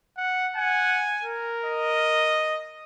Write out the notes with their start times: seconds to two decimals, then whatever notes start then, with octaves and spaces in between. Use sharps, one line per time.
0.17 F#5
0.56 F#5 G#5
1.23 A#4
1.65 D#5